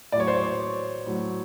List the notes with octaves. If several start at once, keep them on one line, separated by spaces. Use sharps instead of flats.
A2 F#3 C#5 D5
C5
C#5
A2 F#3